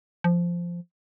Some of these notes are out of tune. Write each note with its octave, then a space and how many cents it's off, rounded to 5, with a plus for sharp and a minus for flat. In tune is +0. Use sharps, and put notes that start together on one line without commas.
F3 -10